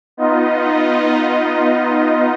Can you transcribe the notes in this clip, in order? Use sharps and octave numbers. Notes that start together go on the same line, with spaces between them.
B3 D#4 F4 D#5